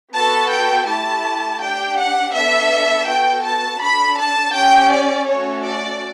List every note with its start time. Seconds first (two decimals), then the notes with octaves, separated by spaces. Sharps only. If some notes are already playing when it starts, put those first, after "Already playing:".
0.14 B3 F#4 A4 A5
0.52 G5
0.88 A3 E4 G4 A5
1.61 D4 G4 G5
1.98 F#5
2.34 B3 D4 A4 E5
3.07 B3 F#4 A4 G5
3.44 A5
3.81 D4 A4 B5
4.18 A5
4.54 C#4 G4 G5
4.91 D5
5.27 A3 C#4 F#4 A4 C#5
5.64 D5